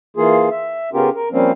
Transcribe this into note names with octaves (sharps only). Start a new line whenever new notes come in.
E3 A#3 F4 G#4
E5
C#3 B3 C#4 F4 G4 A#4
A#4
F3 G3 A#3 C4 C#4